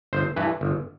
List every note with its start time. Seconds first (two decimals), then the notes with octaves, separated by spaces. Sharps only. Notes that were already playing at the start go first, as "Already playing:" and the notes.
0.13 G1 C5
0.36 G2 E3 B4
0.61 G1